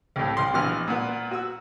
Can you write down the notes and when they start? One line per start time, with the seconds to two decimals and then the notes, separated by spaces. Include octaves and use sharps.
0.16 C2 A2
0.37 C2 C6
0.54 A#1 B2 E3 F6
0.87 A#2 B3
1.31 F#4 E6